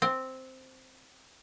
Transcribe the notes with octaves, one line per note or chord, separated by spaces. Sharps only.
C4